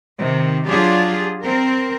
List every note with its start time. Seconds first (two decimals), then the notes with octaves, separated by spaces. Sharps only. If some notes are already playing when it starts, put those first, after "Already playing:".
0.17 C3 D#3
0.67 F#3 D4 F4 G4 G#4
1.42 C4 A#4